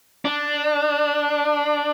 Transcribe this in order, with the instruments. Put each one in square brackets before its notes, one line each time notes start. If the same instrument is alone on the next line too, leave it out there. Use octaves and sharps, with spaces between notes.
[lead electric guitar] D4